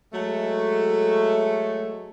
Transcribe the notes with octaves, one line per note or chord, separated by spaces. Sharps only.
F#3 G#3 A3